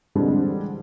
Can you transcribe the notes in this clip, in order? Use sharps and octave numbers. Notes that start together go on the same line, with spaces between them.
D3 E3 G3 G#3 C4 D4